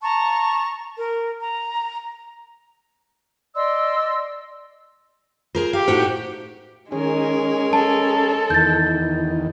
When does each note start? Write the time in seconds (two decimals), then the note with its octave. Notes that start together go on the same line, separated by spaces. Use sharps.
0.02 A5 A#5 C#6
0.96 A#4
1.40 A#5
3.55 D5 D#5 C6 E6
5.55 F4 G#4 A#4 C5
5.73 G4 F5
5.88 A2 D#4 F#4 C5
6.92 D#3 G#3 C#4 G#4 A#4
7.73 A4 A5
8.50 E2 D#3 G6 A6